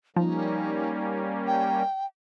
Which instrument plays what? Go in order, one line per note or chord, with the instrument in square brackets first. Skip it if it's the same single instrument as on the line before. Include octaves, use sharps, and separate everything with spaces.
[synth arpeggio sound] F3 [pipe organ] G3 A#3 C#4 [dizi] D#4
[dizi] G5